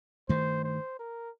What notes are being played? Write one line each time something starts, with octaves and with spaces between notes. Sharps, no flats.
G2 D#3 A3 C5
C5
A#4